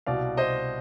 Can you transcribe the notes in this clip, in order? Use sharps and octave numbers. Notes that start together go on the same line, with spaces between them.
C2 B2 D5 F5
C5 D#5